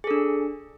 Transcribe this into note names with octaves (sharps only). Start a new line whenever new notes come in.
D4 G#4 A4